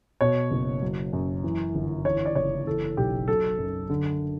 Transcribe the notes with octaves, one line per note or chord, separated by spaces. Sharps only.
B2 C#5
F#1
F#3
F#2
E3
G1
E3 C#5
D5
F#1 C#5
E3 A4
B1 G4
F#3 A4
F#2
D3